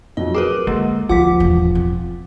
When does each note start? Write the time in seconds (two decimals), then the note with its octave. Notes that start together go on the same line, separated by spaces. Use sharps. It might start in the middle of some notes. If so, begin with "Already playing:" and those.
0.17 F2 F#3 D#5
0.34 G#4 A#4 B4 D6
0.67 D3 G#3 A#3
1.09 D2 F3 F#5 D6 B6
1.40 E1 A1
1.75 C4